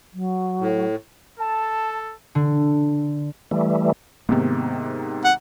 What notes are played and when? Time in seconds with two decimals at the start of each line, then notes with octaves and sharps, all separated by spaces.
0.14 F#3
0.60 A2
1.39 A4 A5
2.35 D3
3.51 E3 G3 A3
4.29 G#2 C3 D#3 A#3 B3
5.25 F#5